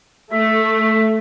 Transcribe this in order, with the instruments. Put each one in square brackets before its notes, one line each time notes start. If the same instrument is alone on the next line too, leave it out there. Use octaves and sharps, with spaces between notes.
[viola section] A3 [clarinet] E5